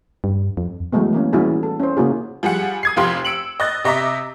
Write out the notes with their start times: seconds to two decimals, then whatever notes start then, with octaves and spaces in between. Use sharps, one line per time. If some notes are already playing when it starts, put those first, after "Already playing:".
0.24 G2
0.57 F2
0.93 E3 F#3 G#3 A3 B3
1.13 E3 A#3 C#4
1.33 E3 G3 C#4 E4 F#4 G#4
1.63 A4
1.80 C#4 C5
1.97 C#3 A#3 E4 F#4 G#4
2.43 F3 G3 G#4 F#5
2.83 D#6 G#6 C7
2.97 F1 F3 F4 G4 C6
3.25 E6 C#7 D7 F#7
3.60 D#5 F#6 A6
3.84 C3 D#5 E5 A#5 D6 B6